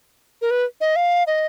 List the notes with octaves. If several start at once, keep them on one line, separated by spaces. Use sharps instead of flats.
A#4
B4
D#5
F5
D#5